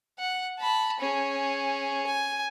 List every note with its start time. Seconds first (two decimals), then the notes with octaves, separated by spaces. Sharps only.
0.19 F#5
0.59 A5 B5
1.00 C#4 G#4
2.07 G#5